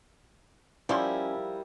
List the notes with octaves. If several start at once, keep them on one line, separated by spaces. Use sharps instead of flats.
F3 G3 C#4 E4 A#4 D5 G#5 C6